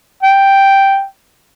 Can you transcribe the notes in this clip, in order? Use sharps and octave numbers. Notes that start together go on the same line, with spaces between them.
G5